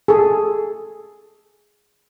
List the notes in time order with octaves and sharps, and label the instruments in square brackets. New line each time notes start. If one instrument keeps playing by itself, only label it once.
[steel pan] G#4 A4